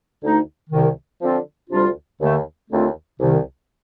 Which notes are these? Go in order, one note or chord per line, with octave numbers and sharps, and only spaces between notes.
D2 D3 A3 D#4
C2 C3 D#3
D3 F3 C4 F4
D2 C3 G3 D4 F4
D#2 D3 A3
D#2 D3 A3 C4 F4
C2 C3 D#3